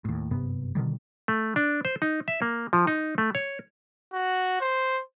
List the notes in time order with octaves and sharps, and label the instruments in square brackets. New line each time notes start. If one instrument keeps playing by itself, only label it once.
[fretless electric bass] D#2 A2
F#1 G2 C3 B3
B2 D3 D#3 G3
[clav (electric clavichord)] A3
D4
C5
D#4
E5
A#3
F3
D#4
A3
C#5
[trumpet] F#4
C5